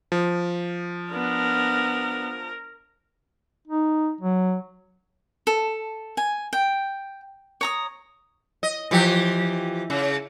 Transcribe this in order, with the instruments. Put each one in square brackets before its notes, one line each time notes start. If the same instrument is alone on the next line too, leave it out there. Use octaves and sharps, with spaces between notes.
[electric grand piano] F3
[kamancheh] B3 D4 [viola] A#4
[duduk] D#4
F#3
[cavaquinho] A4
G#5
G5
C#5 A#5 D#6
[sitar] D#5
E3 F3 G4
C#3